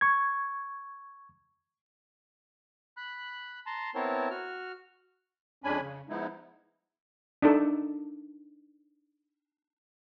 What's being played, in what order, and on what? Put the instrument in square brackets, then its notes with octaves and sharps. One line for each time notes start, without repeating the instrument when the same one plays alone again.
[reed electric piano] C#6 G#6
[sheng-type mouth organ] B5 F#6
A5 A#5 C6
B3 C4 E4 A#4 C#5 A5
F#4 F6
[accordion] F2 G#3 C#4 D4 G#5 B5
C#3
F3 G#3 B3 D#4 E4
[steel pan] D4 D#4 A4